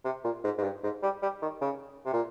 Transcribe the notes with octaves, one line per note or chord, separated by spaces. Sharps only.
C3
A#2
G#2
G#2
G2
G#2
G3
G3
D#3
C#3
C3
A#2